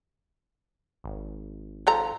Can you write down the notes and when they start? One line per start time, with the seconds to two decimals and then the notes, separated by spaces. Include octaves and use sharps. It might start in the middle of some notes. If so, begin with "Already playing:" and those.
1.04 G#1
1.87 F3 A4 A#5